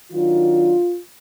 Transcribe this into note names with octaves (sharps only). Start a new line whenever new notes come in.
D#3 F#3 D4 F4